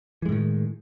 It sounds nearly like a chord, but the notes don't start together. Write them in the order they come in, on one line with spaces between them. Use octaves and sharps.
E3 G#3 A2 D#3